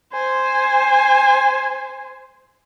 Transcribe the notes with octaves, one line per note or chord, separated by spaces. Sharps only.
C5 G#5